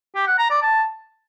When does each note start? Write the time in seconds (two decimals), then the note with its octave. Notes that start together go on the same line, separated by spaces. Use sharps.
0.15 G4
0.27 F#5
0.39 A#5
0.50 D5
0.62 A5